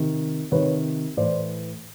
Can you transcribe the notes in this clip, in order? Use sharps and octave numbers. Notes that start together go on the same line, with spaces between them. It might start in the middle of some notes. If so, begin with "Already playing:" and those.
Already playing: C3 D#3
C3 D#3 B4 C#5
A2 E3 C5 D5